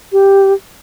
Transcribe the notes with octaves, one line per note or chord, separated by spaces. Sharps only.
G4